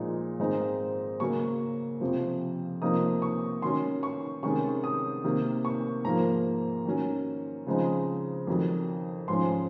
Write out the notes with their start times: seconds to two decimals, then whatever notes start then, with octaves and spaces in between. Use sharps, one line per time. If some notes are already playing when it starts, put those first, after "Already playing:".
Already playing: A#2 F3 G#3 D#4
0.39 G#2 D#3 G#3 C4 D#4
1.20 C#3 F#3 A#3 C#4 C#6
2.00 F2 C3 F3
2.82 C3 F3 A#3 D#4 D#6
3.22 C#6
3.62 D#3 F#3 C#4 C6
4.03 C#6
4.43 C3 D#3 G#3 C#4 C#6
4.84 D#6
5.24 C3 D#3 A#3
5.65 C#6
6.05 G#2 F3 A#3 A#5
6.86 D#3 F#3 C#4
7.67 C#3 F3 G#3 C4 D#4
8.47 F2 D#3 F#3
9.28 G#2 F3 G#3 C#4 C6